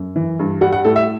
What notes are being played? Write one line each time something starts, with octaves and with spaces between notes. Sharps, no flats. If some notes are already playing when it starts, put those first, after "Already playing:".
Already playing: F#2
E3
G2
G3 F#5
F#5
A2 A4
E5